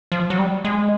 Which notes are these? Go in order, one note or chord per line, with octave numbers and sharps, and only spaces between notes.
F3
F#3
G3
G#3